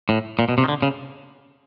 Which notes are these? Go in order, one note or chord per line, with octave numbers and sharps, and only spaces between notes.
A2
A#2
B2
C3
D#3
D3
C#3